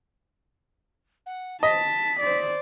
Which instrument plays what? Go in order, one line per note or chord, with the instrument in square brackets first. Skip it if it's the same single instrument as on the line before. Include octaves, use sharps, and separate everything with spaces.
[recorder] F#5
[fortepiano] D#5 [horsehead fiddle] A5 [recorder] B6
[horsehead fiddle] C5 D5